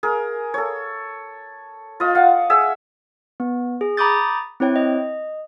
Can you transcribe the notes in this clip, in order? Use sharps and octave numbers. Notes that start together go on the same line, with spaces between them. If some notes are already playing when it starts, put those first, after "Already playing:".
G#4 A#4
A4 C#5
F4 D#5
F5 F#5
G#4 E5 E6
B3
G#4
A#5 B5 D6 D#6 G6 A6
C4 E4 C#5 G5
D#5